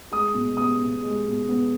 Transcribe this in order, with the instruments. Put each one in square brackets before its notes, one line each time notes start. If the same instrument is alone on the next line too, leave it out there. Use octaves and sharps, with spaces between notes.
[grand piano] G#3 D#6
B2
B3 D#6
B2
G#3
B2
B3